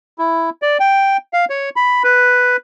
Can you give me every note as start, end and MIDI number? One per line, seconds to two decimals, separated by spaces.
0.19 0.50 64
0.62 0.77 74
0.80 1.17 79
1.33 1.45 77
1.50 1.69 73
1.76 2.03 83
2.04 2.56 71